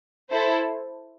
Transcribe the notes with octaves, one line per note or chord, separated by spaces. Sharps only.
E4 A4 C5